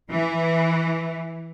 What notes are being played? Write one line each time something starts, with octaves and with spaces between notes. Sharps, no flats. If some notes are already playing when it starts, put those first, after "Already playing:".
E3